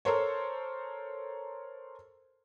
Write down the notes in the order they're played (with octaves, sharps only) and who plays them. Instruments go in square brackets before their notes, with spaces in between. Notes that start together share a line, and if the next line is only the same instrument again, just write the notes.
[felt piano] A4 A#4 C5 C#5